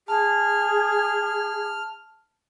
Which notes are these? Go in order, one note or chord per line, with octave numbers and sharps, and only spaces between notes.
G#4 A5 F6